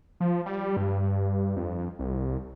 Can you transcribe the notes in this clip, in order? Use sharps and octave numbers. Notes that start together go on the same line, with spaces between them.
F3
G3
G2
F2
C2